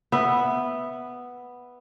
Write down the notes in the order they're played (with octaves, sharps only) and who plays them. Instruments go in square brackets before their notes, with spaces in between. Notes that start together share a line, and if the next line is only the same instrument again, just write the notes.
[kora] B3 E5